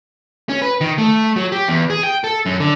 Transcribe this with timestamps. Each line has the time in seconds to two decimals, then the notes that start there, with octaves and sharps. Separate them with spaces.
0.49 C#4
0.62 B4
0.81 D#3
0.98 A3
1.36 F#3
1.52 G4
1.68 E2
1.90 G#4
2.03 G5
2.24 A4
2.46 F#2
2.60 D3